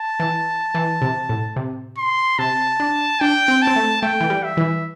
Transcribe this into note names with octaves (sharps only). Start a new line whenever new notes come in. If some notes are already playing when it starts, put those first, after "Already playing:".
Already playing: A5
E3
E3
C3
A2
C3
C6
C3 A5
D4
D4 G5
C4
A5
C4
A3
A3 G5
E3
G3
E5
E3